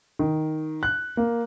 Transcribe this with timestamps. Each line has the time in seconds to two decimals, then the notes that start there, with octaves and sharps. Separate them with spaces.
0.19 D#3
0.83 F#6
1.17 A#3